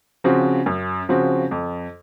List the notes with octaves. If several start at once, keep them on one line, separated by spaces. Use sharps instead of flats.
C#3 F3 C4 F#4
F#2
C#3 F3 C4 F#4
F2